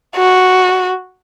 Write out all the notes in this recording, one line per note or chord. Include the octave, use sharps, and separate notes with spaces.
F#4